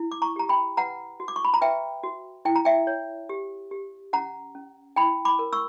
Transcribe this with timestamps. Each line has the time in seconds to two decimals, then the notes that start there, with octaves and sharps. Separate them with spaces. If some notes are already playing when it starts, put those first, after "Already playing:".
Already playing: E4
0.12 D6
0.22 A#5 C#6
0.36 G4 A#5
0.49 G5 B5
0.77 B4 F#5 A#5
1.20 F#4
1.28 D6
1.36 C#6
1.45 B5
1.54 A#5
1.61 B4 E5 G5
2.03 F#4
2.45 E4 G5
2.56 A#5
2.65 E5 G5
2.87 C#5
3.29 G4
3.71 G4
4.13 C#4 F#5 A#5
4.55 C#4
4.96 E4 G5 B5
5.25 B5 D6
5.39 A#4
5.53 C#6 E6